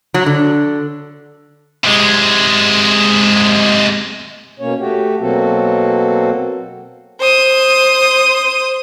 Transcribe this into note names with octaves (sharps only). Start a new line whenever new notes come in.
F#3
D3
C3 G#3
B2 A#3 C#4 C#5
A3 F#4 G4
B2 F#3 A#3 C4 F#4 A4
C5 D#6